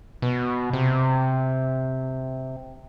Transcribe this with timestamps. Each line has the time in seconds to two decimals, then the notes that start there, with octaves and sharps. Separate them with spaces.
0.22 B2
0.73 C3